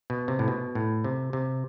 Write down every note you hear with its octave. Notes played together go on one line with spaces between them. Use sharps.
B2
C3
A2
B2
A2
C3
C3